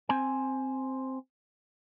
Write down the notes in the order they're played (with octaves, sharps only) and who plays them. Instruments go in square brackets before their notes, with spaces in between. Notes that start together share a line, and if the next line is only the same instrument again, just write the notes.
[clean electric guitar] C4 C5 G#5